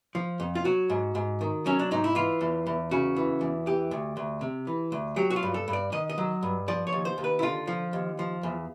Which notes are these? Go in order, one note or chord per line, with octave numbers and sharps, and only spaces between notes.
F3
F2
F4
F#3 F#4
G#2
G#2
D#3
F#3 C#4
D4
G#2 D#4
E4
E3 F4
E2
E2
C#3 F#4
E3
E2
E3 G4
D2
D2
C3
E3
D2
F#3 G4
F#4
F4
G2
A4
G2
D5
D#3 D#5
D#5
F#3
G2
F3 D5
C#5
D#2
C5
D#2
B4
E4
D3 F4
F3
D#2
F3
E2